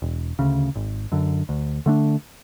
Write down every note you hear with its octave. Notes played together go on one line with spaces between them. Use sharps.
E1
D2 C#3
G#1
F#2 D3
D2
D3 A3 D4